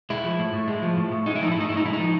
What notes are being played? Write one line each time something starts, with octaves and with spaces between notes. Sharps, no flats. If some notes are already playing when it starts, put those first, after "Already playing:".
G#3 E4
F3
A2
A2
G#3
F3
A2
A2
G#3 D#4
E4
F3 D#4
E4
A2 D#4
A2 E4
D#4
G#3 E4
D#4
F3